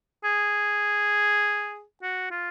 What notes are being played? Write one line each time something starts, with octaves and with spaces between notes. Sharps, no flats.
G#4
F#4
F4